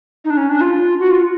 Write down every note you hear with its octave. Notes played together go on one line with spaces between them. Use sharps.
D#4
D4
C#4
D4
F4
F#4
F4